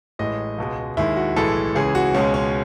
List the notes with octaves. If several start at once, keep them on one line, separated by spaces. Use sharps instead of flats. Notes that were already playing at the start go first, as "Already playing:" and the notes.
A1 A2 G#3 D#5
C#2 B2 G#3
D#2 D#3 G#3 E4
F#4
B1 A2 E3 G#3 A4
C#2 C#3 E3 G#4
F#4
C#2 B2 G#3 C#4
C#4